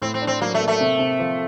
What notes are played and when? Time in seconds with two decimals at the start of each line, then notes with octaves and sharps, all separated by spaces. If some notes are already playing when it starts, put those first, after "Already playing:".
0.02 A2 C4
0.14 C4
0.22 D4
0.27 C4
0.41 F#3 A#3
0.54 A3
0.60 A#3
0.68 A3
0.81 C3
0.99 C3
1.19 F3